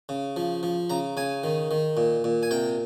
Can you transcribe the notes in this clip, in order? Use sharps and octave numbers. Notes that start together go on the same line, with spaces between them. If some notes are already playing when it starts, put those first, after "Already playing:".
C#3
F3
F3
C#3 A#5
C#3 G#5
D#3
D#3
A#2
A#2
G#5
C3 G5